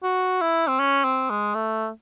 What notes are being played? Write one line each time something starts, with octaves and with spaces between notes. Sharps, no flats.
F#4
E4
C4
C#4
C4
G#3
A3